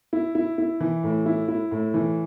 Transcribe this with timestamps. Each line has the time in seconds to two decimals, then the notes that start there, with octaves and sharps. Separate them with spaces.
0.13 E4
0.35 E4
0.58 E4
0.80 E3
1.03 A2
1.26 E4
1.48 E4
1.71 A2
1.94 E3